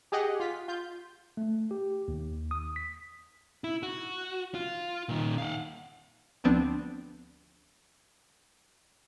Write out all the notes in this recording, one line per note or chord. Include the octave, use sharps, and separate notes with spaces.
G4 G#4 D#5 F#5
F4 B6
F4 G6
A3
G4
D#2
D#6
B6
E4
F#4
F4
A#2 D#3
F5 F#5
D2 F3 B3 C4 D4